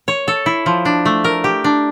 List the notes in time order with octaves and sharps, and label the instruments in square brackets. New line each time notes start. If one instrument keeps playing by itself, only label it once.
[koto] C#5
A4
E4
F3
D4
A3
A#4
G4
D4